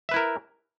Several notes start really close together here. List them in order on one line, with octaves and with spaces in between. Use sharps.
E5 B4 E4 A#4